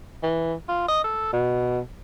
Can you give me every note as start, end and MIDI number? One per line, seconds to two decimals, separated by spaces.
0.23 0.54 52
0.69 0.84 65
0.88 1.02 75
1.04 1.30 69
1.33 1.79 47